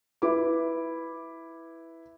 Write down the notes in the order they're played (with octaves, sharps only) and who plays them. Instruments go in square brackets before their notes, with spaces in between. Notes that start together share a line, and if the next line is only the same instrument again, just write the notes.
[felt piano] E4 B4 D6